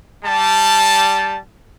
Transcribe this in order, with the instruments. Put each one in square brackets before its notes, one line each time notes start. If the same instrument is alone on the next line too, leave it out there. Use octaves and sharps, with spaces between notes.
[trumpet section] G3 A5